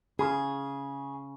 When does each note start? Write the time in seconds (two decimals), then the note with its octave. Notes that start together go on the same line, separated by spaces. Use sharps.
0.19 C#3 G#4